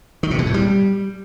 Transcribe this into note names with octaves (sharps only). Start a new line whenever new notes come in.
D#3
C3
B2
A2
G3